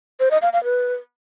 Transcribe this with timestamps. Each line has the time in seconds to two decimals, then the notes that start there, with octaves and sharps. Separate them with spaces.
0.20 C5
0.31 D#5
0.42 F5
0.53 F5
0.64 B4